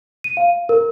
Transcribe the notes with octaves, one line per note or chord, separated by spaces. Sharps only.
D#7
F5
A#4